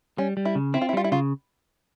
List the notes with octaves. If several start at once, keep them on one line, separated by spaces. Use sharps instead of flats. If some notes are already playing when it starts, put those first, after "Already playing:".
G3 C#4
G3
E4
C#3
C4 E4
F4
E4
G3 F4
E4
C#3 F4